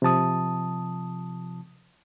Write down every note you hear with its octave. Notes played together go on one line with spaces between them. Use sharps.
C3 F3 A5 D#6